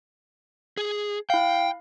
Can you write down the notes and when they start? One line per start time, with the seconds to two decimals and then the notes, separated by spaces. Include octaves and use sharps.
0.77 G#4
1.30 E4 F5 G5